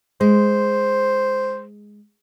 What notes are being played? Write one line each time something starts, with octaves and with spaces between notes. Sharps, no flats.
G#3 C5